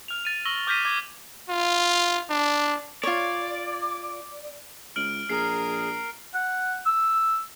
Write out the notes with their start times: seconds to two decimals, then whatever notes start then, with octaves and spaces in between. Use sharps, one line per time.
0.08 F6 F7
0.25 A6 D#7
0.45 C#6 E6 A#6 F#7 G7
0.67 D6 F6 G6 A#6 B6 D#7
0.85 D6 G#6
1.49 F4
2.30 D4
3.03 F4 C#5 D5
4.96 C#2 F6 D7 F#7
5.29 A#1 G#4 A#4 C7
6.34 F#5
6.86 E6